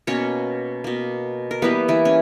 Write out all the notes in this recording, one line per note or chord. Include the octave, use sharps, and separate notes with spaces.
B2 A#3 C#4 C#5
B2 A#3
A#4
E3 G3 A#3 B3 B4
E3 E4
C#4